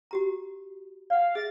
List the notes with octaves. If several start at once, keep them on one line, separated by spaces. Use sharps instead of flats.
F#4 G4 A#5
D5 F5 F#5
G#4 E5 A6